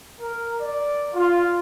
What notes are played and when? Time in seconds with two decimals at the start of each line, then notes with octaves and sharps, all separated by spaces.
0.20 A#4
0.59 D5
1.14 F4